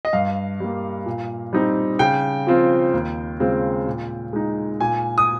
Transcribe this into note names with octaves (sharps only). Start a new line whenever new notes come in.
D#5
G2 F5
G3 A#3
A#2
G3 C4 D#4
C#3 G5
F3 C4 F4
D#2
C#3 G#3 C4 F4
A#2
G#3 D#4
A#2 G#5
D#6